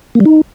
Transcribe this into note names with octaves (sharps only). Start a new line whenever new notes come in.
A#3
G3
D#4